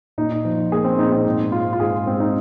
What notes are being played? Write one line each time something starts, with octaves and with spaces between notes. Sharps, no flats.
A#2 D#4
F3
A#3 G#4
C4
A#2 D#4
C4
G#2
G#3 F4
F4
G#2 G#4
G#3 C4
D#4